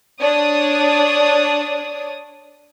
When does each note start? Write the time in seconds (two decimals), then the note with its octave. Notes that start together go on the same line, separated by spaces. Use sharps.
0.22 D4 C#5 D5 D#6